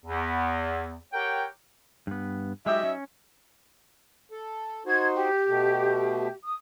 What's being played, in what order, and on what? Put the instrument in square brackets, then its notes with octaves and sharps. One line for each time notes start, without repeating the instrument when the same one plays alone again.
[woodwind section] E2
G4 A#4 C#5 F#5 G5
[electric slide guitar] G2 B3
[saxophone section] F#3 D#4 E5 [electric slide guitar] G#3 G4
[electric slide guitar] C#4
[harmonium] A4
[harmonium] D#4 F#4 C5 [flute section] G#6
[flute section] G4
[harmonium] B2 A3
[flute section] D#6